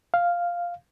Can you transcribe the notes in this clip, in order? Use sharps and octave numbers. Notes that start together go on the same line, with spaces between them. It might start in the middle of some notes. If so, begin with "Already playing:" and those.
F5